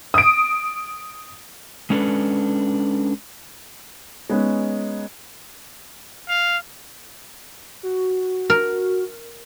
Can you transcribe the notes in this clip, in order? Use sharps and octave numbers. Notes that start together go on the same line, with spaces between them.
D#6 D7
G#3 C#4 D4 A4 B4
G#3 B3 C#4 D#4
F5
F#4
A#4